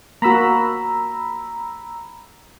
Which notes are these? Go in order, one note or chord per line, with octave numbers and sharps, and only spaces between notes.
A#3 F#4 A#5 B5 E6